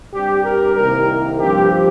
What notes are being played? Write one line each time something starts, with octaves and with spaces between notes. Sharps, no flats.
G2 G3 C4 G4
A#4
C2 C3 D#3 A#3 A#4
G2 F3 C4 G4